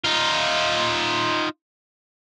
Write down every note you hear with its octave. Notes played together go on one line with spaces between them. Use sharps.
D#4 F4